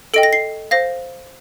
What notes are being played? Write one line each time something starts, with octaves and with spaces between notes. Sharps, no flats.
A4 D#5 G5 D7
A#6
C7
C5 F5 A#6